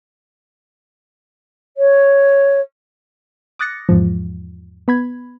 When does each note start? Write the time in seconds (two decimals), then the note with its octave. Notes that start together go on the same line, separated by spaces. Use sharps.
1.77 C#5
3.59 D6 D#6 F#6 A6 A#6 C#7
3.89 E2 G#2 F3
4.88 B3 B5 G#6